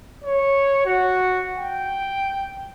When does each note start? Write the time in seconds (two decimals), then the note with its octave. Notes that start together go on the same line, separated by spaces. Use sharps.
0.24 C#5
0.86 F#4
1.58 G5